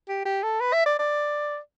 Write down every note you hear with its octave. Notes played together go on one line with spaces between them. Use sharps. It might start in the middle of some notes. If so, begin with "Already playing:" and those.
G4
G4
A4
B4
E5
D5
D5